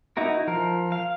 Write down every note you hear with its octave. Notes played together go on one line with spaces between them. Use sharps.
D#4 E4 F#4 A#4
F3 A#4
F5